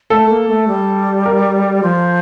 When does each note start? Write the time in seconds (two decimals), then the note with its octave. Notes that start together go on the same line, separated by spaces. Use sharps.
0.10 A3 A4
0.29 A#3
0.48 A3
0.68 G3
1.26 A#4
1.83 F3